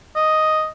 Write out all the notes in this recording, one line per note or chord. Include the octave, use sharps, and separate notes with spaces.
D#5